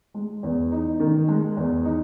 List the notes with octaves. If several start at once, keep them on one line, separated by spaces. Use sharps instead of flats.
G#3
E2
D#4
D#3
G#3
E2
D#4